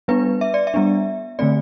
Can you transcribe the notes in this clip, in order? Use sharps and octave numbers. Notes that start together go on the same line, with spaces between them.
G3 B3 D4 B4
E5
D5
E5
G3 B3 D4
D3 A3 C4 D5